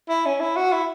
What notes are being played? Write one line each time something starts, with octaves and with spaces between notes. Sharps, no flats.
E4
C#4
E4
F#4
E4